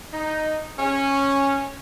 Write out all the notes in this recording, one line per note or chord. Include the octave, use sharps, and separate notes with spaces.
D#4
C#4